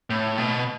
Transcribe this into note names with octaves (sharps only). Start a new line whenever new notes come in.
A2
B2